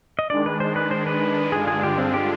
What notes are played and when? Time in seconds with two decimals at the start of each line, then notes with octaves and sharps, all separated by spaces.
0.19 D#5
0.30 D#3 G#3 D4 D5
0.46 B4
0.60 C5
0.76 B4
0.91 C5
1.07 B4
1.52 G2 D3 G#3 D4 F4 G#4
1.67 G#4
1.83 G4
1.98 C4
2.14 G4